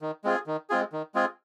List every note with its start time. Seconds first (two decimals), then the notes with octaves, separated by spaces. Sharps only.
0.01 D#3
0.24 G#3 C4 F4 G#4
0.47 D#3
0.70 G#3 C4 F4 G#4
0.92 D#3
1.15 G#3 C4 F4 G#4